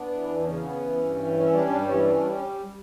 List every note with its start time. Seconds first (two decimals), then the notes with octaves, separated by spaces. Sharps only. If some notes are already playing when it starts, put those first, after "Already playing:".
Already playing: B3 D4
0.10 E3
0.28 E2
0.38 D4
0.45 C#3 C#4
0.62 B3
0.80 E3
0.98 G2
1.15 E3
1.33 C#4
1.41 E4
1.50 G3 D4
1.67 G2 D4
1.81 D4
1.85 E3 C#4
2.04 C#4 D4
2.16 G3 D4
2.30 C#4